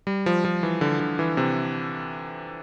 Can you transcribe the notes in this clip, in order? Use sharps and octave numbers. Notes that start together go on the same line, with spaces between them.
G3
F3
F3
E3
D3
D3
E3
C3